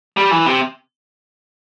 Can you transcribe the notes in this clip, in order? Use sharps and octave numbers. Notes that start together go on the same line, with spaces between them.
G3
E3
C3